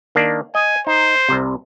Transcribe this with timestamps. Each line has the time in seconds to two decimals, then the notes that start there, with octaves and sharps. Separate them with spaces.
0.15 D#3 A#3 D4
0.55 D#5 G#5
0.87 D#4 C5
1.29 C2 C3